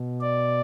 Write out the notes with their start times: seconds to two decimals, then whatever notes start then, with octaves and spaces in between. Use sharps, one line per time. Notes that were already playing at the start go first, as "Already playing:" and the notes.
Already playing: B2
0.21 D5